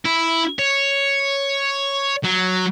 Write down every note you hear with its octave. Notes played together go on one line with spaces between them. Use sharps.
E4
C#5
F#3